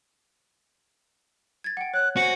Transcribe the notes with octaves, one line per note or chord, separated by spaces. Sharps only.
G#6 A6
F#5 G5
C#5 F#6
F#4 C5 G#5 A#6 C#7